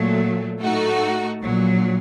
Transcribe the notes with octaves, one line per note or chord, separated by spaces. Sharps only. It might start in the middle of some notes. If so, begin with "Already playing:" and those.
Already playing: A#2 F#3 A3
A2 A3 D#4 F#4
A#1 A#2 F#3